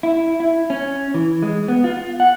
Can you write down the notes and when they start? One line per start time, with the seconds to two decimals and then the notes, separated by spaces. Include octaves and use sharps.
0.03 E4
0.40 E4
0.70 C#4
1.14 E3
1.42 G#3
1.68 B3
1.84 F4
2.20 F#5